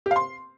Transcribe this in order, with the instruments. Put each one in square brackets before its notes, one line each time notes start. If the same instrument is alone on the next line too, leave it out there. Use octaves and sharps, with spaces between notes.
[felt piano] G4
F5
C6